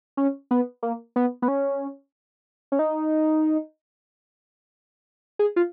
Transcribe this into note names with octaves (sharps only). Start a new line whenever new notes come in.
C#4
B3
A#3
B3
B3
C#4
C#4
D#4
G#4
F4